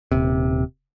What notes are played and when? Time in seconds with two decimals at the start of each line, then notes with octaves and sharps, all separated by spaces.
0.12 D#1 C3